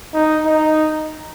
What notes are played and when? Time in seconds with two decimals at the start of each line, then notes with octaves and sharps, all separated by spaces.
0.14 D#4
0.46 D#4